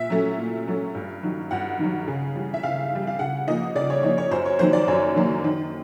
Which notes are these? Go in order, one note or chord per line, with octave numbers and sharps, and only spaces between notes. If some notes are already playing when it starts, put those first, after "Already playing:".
Already playing: A#2 E5
F#3 A3 C#4
A#2
F#3 A3 C#4
G2
D#3 F#3
G2 F#5
D#3 F#3
C#3
E3 G3
E5
C#3 F5
E3 G3
F5
C#3 F#5
F3 A#3 D#4 D#5
C#3 D5
C#5
F3 A#3 D#4 C#5
C#5
F#2 C5
C#5
D#3 F#3 A#3 C5
D5
F#2 C#5
D#3 F#3 A#3
D#3